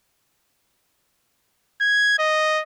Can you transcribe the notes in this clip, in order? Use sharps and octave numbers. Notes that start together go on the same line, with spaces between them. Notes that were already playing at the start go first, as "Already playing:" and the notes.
G#6
D#5